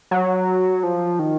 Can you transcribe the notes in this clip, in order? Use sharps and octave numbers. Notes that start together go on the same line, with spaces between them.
F#3
F3
D#3